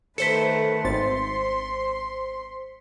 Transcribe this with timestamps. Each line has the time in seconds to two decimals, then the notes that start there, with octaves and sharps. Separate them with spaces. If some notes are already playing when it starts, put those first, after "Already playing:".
0.18 D#3 A3 A4 B4 C5 B6 C#7
0.85 G#1 C5 C6 A6